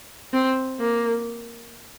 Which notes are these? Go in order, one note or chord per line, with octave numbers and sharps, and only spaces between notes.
C4
A#3